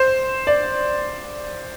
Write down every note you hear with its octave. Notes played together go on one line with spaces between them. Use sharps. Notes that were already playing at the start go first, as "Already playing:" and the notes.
Already playing: C5
D5